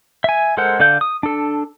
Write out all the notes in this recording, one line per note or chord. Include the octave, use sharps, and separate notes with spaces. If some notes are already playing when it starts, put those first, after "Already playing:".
E5 G#5
G#3 A4 A#4 C5 F#5
D3 A4 D5 F5 G6
D#6
D4 A4